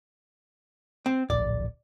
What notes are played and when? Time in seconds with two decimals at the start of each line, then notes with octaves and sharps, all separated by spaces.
1.06 C4
1.30 D1 A#1 D5